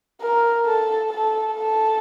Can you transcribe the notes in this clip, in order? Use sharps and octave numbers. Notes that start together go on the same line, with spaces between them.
A#4
A4
A4
A4